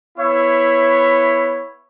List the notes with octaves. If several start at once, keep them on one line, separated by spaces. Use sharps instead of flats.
B3 E4 C#5 E5